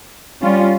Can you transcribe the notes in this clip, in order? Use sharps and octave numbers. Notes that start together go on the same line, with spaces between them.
G3 C#4 F4